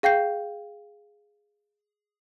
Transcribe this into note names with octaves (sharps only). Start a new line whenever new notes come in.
G#4 F5 G5 G6 C7